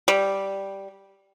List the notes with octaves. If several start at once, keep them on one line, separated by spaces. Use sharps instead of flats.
G3